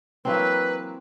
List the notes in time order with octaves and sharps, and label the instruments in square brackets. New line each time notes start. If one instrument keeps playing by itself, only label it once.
[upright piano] E3 F#3 A#3 [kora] C4 [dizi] B4